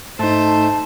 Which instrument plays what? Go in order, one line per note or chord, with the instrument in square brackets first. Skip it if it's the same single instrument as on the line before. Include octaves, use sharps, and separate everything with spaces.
[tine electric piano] G#2 D#4 [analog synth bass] A3 [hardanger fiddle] C5 [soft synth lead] A5